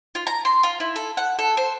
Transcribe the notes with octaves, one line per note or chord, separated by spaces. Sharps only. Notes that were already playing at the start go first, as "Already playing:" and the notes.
F4
A#5
C6
F4
E4
A4
F#5
A4
C5